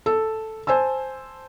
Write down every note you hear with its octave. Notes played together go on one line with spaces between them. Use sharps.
A4
C5 G#5 A5 E6